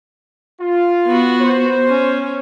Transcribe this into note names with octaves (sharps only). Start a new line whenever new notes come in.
F4
B3 F#4
C5
C#4